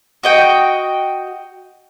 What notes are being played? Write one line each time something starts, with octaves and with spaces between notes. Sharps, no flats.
F#4 D#5 G5